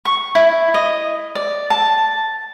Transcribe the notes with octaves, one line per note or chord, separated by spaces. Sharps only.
C#6
E4
D#5
D5
A5